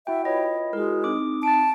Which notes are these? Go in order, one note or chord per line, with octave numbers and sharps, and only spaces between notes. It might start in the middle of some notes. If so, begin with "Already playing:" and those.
E4 F#4 E5 F#5 G5
F4 B4 C#5 D#5 B5
G#3 E4 F#4 A#4
C4 D#4 D6 D#6
A5 A6 D7